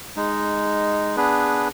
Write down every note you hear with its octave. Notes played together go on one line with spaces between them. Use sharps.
G#3 D#4
B3 D4 G#4 B4